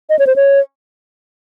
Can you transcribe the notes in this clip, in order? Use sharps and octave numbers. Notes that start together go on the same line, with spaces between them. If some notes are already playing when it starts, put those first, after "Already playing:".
D#5
C#5
C5
C#5